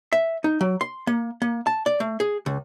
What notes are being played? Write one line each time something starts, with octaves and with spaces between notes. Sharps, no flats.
E5
D#4
F#3
C6
A#3
A#3
A5
D5
A3
G#4
C#2